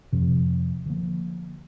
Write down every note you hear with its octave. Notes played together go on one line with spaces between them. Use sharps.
F2 C3 F3
D3 F3 A#3